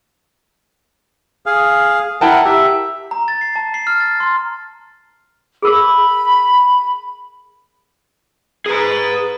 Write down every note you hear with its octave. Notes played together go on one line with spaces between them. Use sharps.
G#4 F5
E4 A#4 F#5 G5 A5
G4 E5
A#5
A6
C7
A5
C7
F6
A6
C6
G#4 A#4 B5 D6
G#4 B4 A#5